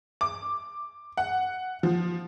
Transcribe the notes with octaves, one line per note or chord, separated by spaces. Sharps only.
D6
F#5
F3